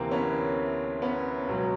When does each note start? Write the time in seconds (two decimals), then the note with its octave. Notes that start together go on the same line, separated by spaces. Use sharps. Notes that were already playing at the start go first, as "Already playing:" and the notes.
Already playing: D2 C3 E3 A#3 C4
0.11 B3 C#4
1.02 B3 C#4
1.47 C#2 B2 F#3